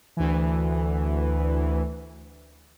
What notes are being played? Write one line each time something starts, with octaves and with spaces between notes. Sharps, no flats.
D2 E3